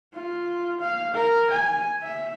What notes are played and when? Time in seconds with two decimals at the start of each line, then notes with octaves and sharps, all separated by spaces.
0.14 F4
0.81 F5
1.15 A#4
1.51 G#5
2.03 E5